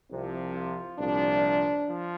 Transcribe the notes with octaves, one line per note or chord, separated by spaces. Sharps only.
C2 C3 F3
F4
C2 A#2 F3 D4
F3